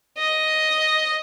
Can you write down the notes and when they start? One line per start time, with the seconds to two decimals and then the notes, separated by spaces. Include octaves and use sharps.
0.18 D#5